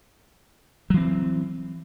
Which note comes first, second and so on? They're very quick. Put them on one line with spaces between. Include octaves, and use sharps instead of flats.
F#3 E3 C4